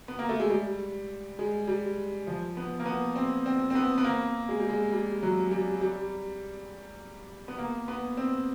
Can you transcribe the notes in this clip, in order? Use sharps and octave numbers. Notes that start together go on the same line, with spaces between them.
B3
A#3
A3
G#3
G3
G#3
G3
F3
B3
A#3
B3
C4
C4
C4
B3
B3
A#3
G#3
G3
G#3
G3
F#3
G3
G3
B3
A#3
B3
C4